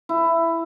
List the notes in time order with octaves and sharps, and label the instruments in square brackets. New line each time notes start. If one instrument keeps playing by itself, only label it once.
[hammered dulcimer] E4